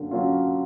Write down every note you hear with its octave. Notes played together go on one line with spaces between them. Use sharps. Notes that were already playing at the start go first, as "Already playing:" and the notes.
Already playing: D3 F#3 A#3 C#4
F#3 A#3 C#4 F4